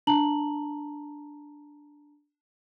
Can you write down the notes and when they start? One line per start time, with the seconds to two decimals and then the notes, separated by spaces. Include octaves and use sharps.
0.07 D4 A5 A#5 F#7